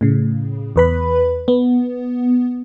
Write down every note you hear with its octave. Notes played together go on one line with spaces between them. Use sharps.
A2 C#3
E2 B4 B5
B3